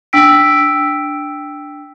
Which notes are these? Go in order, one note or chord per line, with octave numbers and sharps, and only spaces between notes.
D4 G5 E6 B6 D7